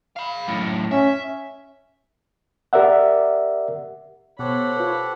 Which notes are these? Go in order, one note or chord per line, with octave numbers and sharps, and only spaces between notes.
F5 B5
F#2 A2
C#4 E5
G4 A#4 D5 E5 F#5
B2 G4 A4 C5 C#5 F#5 B5
F4 B4